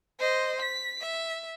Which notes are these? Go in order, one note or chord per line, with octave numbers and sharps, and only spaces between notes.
C5 D#5
B6
E5